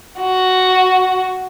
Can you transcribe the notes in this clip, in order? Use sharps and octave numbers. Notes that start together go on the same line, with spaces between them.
F#4